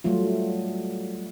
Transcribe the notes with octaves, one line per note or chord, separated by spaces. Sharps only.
F#3 G3 A3 F4